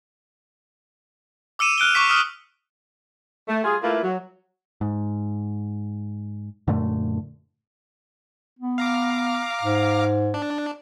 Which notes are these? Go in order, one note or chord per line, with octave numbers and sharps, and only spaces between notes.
D6 E6 C#7 D#7 E7
F6 F#6 D7 D#7 G7
C#6 D6 B6
D#6 F6
A3
G3 F4 G#4
A3 A#3 E4 F4 B4
F#3
G#2
F#2 A#2 D3 A3
B3
F5 A#5 D6
G#2
D4